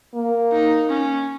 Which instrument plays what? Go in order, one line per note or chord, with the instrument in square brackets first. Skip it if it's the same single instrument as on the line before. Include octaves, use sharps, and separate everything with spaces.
[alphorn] A#3
[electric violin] D#4
C#4